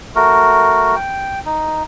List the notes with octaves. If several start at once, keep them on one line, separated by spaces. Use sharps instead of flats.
A3 F#4 A#4
G5
D#4